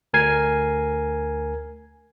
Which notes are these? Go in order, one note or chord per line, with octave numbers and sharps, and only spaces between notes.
D2 A#4 G#5 G#6 C7